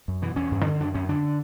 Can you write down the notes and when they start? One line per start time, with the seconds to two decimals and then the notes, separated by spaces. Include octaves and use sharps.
0.08 F#2
0.22 B2 E3
0.36 E2 C#4
0.51 G2
0.66 D3
0.80 F#2 D4
0.94 F#2 C#4
1.09 D3 D4